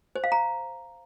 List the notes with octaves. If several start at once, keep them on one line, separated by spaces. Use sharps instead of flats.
C5
F5
A#5